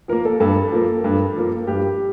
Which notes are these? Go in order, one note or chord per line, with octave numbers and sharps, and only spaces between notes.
F3 A#3 A#4
A4
G2 A4
F3 A#3
G2
F3 A#3
G2 G4